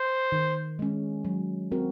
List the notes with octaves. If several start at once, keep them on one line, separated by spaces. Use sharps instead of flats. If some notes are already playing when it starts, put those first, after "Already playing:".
Already playing: C5
D#3
G#3 C#4
F#3
C4 F#4 A#4